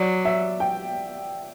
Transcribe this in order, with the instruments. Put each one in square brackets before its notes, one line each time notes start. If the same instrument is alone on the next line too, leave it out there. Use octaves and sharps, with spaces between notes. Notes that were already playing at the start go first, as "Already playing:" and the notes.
Already playing: [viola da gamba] F#3 [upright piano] D5
[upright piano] E5
G5